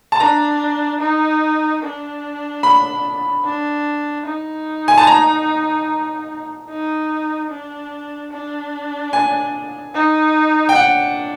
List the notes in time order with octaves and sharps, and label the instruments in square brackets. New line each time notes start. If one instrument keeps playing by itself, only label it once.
[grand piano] A5
[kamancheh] D4 [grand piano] A#5
[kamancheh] D#4
D4
[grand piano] B5
[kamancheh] D4
D#4
[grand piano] G#5
A5
A#5
[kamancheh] D#4
D4
D4
[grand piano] G#5
[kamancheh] D#4
[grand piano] G5
[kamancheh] D4 [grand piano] F#5